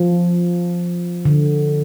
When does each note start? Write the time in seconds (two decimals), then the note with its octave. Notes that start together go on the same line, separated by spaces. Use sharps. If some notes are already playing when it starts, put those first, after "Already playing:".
Already playing: F3
1.25 D3